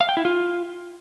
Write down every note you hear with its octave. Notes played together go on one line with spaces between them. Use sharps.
F5
G5
E4
F4